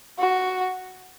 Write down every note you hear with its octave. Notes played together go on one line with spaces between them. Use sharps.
F#4